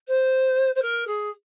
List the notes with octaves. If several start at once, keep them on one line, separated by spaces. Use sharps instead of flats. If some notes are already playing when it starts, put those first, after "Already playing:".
C5
C5
A#4
G#4